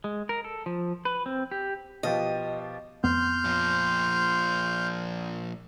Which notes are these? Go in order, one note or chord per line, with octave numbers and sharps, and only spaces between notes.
G#3
A#4
A4
F3
B4
C4
G4
B2 F3 G4 D#5
F2 B3 C6 F6 G6
A#2 F3